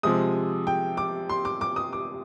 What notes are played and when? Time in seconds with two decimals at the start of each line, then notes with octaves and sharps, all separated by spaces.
0.03 C3 F3 G#3 D#6
0.67 G5
0.97 D6
1.29 C6
1.45 D6
1.61 D6
1.76 D#6
1.93 D6